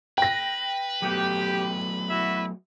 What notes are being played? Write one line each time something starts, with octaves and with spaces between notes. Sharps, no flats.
B4 G5 A#6
F#3 A3 B3 G4
E4 F#4 E5